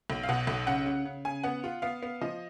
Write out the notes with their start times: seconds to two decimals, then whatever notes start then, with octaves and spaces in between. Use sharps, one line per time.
0.10 B1
0.23 F5
0.29 B2 F#5
0.47 B1
0.67 C#3 F#5
0.86 C#3
1.05 C#3
1.25 C#3 G#5
1.44 B3 F#5
1.64 F4
1.82 B3 F5
2.03 B3
2.21 F3 D#5